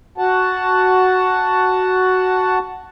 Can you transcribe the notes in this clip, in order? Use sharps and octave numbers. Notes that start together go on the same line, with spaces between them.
F#4 F#5 A5